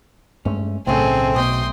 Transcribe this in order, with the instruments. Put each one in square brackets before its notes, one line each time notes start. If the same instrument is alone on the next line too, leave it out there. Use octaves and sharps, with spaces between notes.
[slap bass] G2 G#3 A3 [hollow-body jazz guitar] C#4
[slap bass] B1 A3 [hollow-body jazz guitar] A2 C#3 [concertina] C4 [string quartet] G#4 A4
[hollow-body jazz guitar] B2 [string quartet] G5 C6 D#6